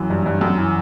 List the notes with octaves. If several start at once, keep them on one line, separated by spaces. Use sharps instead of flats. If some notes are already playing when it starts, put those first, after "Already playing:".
Already playing: F#2 E3 F#3
G2
G2
F#2
E3